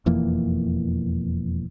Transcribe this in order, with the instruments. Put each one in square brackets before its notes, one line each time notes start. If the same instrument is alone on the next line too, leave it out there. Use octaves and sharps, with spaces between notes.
[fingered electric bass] E1 F2 E3 A#3